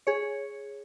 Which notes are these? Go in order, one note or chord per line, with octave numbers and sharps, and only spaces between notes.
G#4 C#5